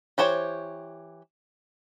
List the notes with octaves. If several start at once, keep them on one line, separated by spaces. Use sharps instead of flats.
E3 G4 C5 C#5